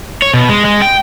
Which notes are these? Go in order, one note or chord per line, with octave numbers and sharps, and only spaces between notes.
C#5
B2
G#3
G#3
G5